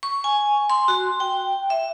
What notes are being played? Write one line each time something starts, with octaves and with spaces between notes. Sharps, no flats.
C#6
G#5
C6
F#4
G5
E5